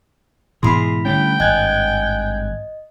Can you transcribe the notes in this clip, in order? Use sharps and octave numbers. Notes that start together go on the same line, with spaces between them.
G#2 B2 E3 E4 G#4 B5 C6
D3 G3 A3 C#4 G5
G#1 G2 D#5 G#5 F#6 G#6